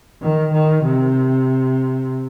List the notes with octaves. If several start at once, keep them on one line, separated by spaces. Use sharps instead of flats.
D#3
D#3
C3